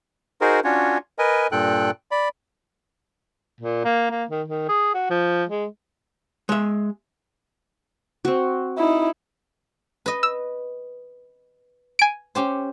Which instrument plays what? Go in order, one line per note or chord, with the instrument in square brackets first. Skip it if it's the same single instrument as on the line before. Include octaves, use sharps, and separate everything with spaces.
[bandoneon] D#4 F#4 G#4 A#4 C5
C#4 D4 F4 F#4 C#5
A#4 B4 D#5 G#5
G2 A#2 A4 G5 F#6
D5 B5
[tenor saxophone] A#2
A#3
A#3
D#3
D#3
G#4
F#4
F3
G#3
[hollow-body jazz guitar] G#3 E5
[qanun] C4 F#4
[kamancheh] D#4 E4
[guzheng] B4 D#5
[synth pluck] E6
G#5 D7
[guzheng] C#4 G4 C5